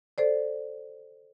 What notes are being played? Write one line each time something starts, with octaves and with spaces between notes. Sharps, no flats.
A4 C5 D5